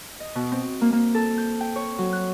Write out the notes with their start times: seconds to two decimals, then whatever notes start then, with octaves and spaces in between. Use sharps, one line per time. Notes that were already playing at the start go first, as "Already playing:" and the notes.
0.20 D#5
0.35 B2
0.52 C4
0.81 A#3
0.92 A#3
1.14 A4
1.38 G6
1.60 G5
1.76 C#5
1.98 F#3
2.13 F#6